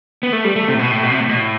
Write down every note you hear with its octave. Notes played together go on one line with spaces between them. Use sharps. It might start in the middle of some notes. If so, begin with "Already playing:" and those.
B3
A3
G3
A3
C3
A2
B2
A2
B2
C3
A2
B2
A2